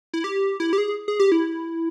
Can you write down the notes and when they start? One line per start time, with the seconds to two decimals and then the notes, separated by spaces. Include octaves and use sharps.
0.14 E4
0.24 G4
0.60 E4
0.73 G4
0.78 G#4
1.08 G#4
1.20 G4
1.32 E4